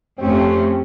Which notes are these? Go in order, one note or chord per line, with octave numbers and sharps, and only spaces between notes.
F2 A3 C4 C#4 G4